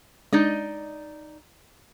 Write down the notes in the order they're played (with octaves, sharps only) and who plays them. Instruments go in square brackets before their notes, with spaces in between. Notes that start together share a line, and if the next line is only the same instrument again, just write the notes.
[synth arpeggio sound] G#3 D4 [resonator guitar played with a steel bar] D#4 D5 D#5